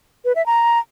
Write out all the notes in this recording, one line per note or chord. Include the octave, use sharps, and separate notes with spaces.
B4
E5
A#5